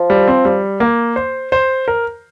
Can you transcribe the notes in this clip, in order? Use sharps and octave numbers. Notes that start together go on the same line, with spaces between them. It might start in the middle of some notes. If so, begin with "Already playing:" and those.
Already playing: F3
G3
C4
G3
A#3
C5
C5
A#4